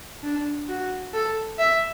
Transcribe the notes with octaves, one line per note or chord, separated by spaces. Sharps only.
D4
F#4
A4
E5